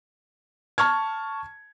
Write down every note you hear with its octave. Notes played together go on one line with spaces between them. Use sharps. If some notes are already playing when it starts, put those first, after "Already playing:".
A5 C#6 F6 G#6